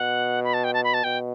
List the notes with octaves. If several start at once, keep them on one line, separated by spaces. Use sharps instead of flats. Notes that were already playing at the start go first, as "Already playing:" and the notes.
Already playing: B2 F#5
B5
A5
G5
A5
B5
A5
B2 G5